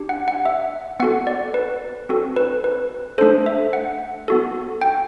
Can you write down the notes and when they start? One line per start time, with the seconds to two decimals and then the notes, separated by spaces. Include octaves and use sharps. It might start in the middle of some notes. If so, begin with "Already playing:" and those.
Already playing: D4 G4
0.09 F#5
0.28 F#5
0.45 E5
1.00 B3 F#4 A4 F#5
1.27 D5
1.54 B4
2.09 C4 F#4 A4
2.36 B4
2.64 B4
3.18 A3 D4 A4 C5
3.46 E5
3.73 F#5
4.28 B3 F#4 A4
4.81 G5